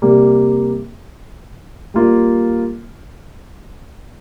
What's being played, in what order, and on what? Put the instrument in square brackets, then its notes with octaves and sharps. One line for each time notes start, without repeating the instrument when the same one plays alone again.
[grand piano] C3 G3 A#3
G3 A#3 F4